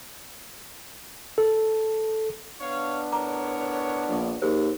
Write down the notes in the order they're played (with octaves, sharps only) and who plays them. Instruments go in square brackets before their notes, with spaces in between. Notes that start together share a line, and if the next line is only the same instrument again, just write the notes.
[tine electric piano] A4
[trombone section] B3 D4 [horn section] C#5 F5
[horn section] A2 A#4 C#5 [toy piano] A#5 D6
[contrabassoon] A#1
[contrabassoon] D#2 [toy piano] G#4 A#4 C5